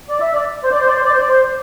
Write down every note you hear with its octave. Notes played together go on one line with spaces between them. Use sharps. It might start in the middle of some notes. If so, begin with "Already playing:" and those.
D5
E5
D5
C5
D5
C5
D5
C5
D5
C5
D5
C5